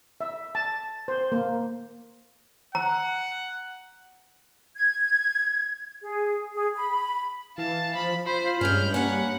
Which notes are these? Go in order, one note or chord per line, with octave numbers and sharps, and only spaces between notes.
E5
A5
C5
A#3
F#5 A#5
G#6
G#4
G#4
B5
E3 F5 A5
F3 B5
F4 C5 B5
G2 G#3 C#4 F6 G6
A#3 C#4 F#5